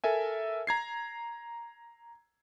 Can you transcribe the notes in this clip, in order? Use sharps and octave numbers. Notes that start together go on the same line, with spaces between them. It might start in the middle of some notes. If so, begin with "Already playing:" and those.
A4 A#4 E5 G#5
A#5 G#6 C7